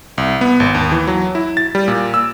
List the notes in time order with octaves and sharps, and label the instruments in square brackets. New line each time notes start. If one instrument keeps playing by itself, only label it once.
[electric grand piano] C2
B3
G#1
D#2
E3
F#3
E4
A6
G3
A#2
E6